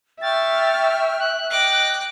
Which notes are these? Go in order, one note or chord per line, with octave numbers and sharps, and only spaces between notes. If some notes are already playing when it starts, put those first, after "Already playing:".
E5 G5 C#6 F6 A6
F#6
D#5 G5 D6